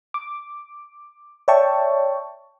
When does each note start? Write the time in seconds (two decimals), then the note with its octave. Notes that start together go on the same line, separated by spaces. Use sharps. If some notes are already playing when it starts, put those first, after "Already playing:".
0.14 D6
1.48 C#5 D5 E5 G5 A5 C#6